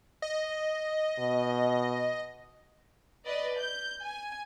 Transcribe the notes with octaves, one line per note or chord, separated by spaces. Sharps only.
D#5
B2
B4 D5 D#5
G6
G#5